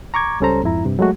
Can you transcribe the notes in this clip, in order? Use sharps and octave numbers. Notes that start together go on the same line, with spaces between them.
A#5 C#6 D6 G#6
C#2 G3 C#4 A4 C5 A#5
F2 G#2 E4 A#5
G2 C3
F#3 G#3 A3 F#4